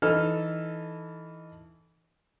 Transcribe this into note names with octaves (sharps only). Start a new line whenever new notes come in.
E3 D#4 A4 F6